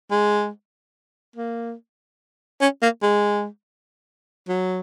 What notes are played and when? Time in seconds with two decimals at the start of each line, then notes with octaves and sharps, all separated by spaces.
0.11 G#3
1.36 A#3
2.61 C#4
2.82 A#3
3.03 G#3
4.49 F#3